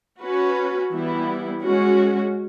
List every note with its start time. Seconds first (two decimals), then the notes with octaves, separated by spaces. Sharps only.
0.19 C#4 F#4 B4
0.91 E3 G3 B3 E4
1.63 G#3 C#4 F#4